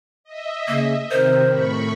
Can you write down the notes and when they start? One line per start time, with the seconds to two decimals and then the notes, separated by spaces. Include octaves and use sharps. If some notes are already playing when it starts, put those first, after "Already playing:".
0.24 D#5 E5
0.68 C#3 A#3
1.11 C3 D#3 A#4 C5
1.50 A2 B5 C#6